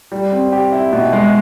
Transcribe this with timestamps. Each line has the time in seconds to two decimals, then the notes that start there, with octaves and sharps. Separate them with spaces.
0.12 G3
0.32 C4
0.52 G4
0.72 E4
0.92 B2
1.13 G#3